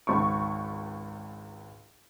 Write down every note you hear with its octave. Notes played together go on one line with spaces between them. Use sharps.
G#1 C#2 C#6